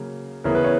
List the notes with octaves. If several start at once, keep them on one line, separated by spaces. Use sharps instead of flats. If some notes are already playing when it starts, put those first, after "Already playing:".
Already playing: C#3 F#3 A#3
C#3 E3 B3 A#4
B4
C#5